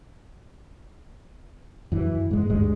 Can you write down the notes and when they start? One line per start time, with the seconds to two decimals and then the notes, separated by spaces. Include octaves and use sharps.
1.92 F#2 E3
2.31 G#2 G#3
2.50 D2 G2 G3 G#3